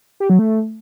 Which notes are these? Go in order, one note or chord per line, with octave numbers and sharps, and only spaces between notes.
G4
F#3
A3